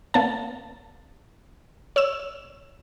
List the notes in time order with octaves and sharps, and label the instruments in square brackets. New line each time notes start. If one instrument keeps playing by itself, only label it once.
[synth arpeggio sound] A#3 B3 A5
C#5 E6 E7